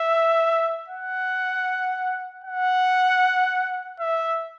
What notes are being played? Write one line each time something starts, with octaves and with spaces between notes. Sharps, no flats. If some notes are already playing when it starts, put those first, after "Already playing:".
Already playing: E5
F#5
F#5
E5